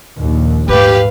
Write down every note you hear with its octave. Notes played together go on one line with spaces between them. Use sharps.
A#1 D#2
G#2 A3 G4 B4 F5